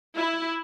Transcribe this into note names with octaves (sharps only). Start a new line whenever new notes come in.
E4